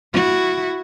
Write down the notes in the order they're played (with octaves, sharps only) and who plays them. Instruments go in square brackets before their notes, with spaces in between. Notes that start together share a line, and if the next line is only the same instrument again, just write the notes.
[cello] E4 F#4